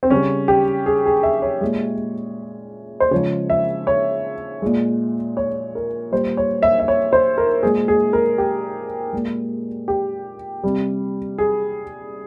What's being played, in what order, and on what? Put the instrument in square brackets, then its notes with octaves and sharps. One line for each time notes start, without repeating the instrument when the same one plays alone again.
[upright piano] C4
C#3 G3 C#4
G4
G#4
G#4
E5
C#5
A#2 G#3
C5
C#3 F3 G#3 C#5
E5
C#5
A#2 G#3
C#5
A#4
A#2 G3 C5
C#5
E5
E5
C#5
C5
A#4
A#2 G#3 G#4
G#4
A#4
G4
A#2 G#3
G4
C3 G3
G#4